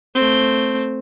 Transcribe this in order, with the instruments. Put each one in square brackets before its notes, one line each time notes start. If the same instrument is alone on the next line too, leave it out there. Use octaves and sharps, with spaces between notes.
[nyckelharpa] A3 C4